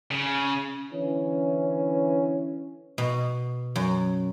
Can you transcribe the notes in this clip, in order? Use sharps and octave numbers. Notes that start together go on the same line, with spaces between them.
C#3
D3 E3 C#4
B2
F#2